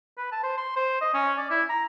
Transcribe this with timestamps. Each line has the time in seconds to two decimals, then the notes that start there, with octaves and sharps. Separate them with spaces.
0.17 B4
0.32 A5
0.43 C5
0.58 C6
0.76 C5
1.01 D#5
1.14 C#4
1.38 D5
1.50 E4
1.70 A#5